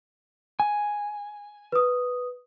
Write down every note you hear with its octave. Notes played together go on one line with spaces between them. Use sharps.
G#5
B4 D#6